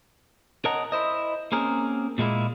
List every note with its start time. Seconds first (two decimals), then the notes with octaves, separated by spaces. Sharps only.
0.65 A#4 C#5 D#5 F#5 A5 A#5
0.92 E4 C5 D#5
1.52 A#3 C4 C#4 G#4 A#4
2.18 A#2 G#3 A#3 E4